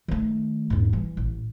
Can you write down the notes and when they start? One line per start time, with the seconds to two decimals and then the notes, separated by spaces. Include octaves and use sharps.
0.08 D#3 A3
0.70 E2 G#2
0.93 E3 G3
1.17 A1